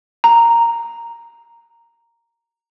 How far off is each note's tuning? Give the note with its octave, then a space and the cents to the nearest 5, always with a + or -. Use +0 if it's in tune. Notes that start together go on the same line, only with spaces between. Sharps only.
A#5 -5